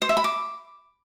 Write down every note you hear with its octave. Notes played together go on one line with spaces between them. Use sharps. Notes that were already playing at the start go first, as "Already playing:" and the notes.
C5
E5
B5
D6